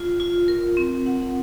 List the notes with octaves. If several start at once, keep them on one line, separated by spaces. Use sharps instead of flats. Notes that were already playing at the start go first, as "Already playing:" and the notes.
Already playing: F4
F4
A#4
C4
F#5